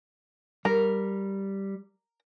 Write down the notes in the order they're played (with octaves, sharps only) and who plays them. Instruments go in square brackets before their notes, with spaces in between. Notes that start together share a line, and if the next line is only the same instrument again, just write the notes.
[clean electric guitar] G3 [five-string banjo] A#4